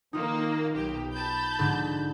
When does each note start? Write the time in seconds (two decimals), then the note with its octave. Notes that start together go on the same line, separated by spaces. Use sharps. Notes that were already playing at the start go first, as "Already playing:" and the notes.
0.13 D#3 A#3 D#4 F4
0.75 B1 G4
1.12 A5 B5 G6
1.59 G#2 D3